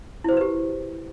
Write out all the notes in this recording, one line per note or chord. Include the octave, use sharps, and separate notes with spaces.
E4 F#4 G4 B4 C5